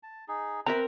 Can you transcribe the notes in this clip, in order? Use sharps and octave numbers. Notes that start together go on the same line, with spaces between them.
A5
D#4 G#4
C4 A#4 B4 E5 A#5